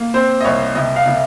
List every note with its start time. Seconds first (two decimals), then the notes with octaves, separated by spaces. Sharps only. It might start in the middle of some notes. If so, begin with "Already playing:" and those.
Already playing: A#3
0.14 C4 C5
0.41 D#5
0.45 C2 C#5
0.75 C3 D#5
0.96 F5
1.06 C3